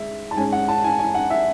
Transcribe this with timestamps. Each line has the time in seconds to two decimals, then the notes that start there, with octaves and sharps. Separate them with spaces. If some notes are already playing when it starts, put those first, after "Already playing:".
Already playing: G#3 E5
0.31 A5
0.37 G#2 G#3 C#4 G#5
0.52 F#5
0.68 A5
0.84 G#5
0.99 G#5
1.15 F#5
1.30 E5